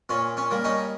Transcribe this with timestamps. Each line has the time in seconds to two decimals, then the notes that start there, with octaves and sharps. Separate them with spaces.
0.09 A#2 C#4
0.37 C#4
0.51 G3 A#3
0.64 C#4 D#4